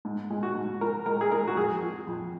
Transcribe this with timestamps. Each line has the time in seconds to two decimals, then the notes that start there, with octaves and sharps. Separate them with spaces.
0.05 G#2
0.30 G#3
0.43 F#4
0.55 G#2
0.81 F3 A#4
1.06 G#3 A#4
1.21 G#4
1.32 G#3 A#4
1.48 F#4
1.56 F2 G#4
1.83 F3
2.07 F2